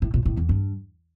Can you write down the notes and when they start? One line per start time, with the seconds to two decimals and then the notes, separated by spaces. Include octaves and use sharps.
0.02 A2
0.14 A#2
0.26 A2
0.37 E2
0.49 G2